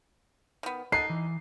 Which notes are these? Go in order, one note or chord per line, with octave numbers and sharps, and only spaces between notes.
D#3 B3
D#4 A4 A#4 F#5 C7
E3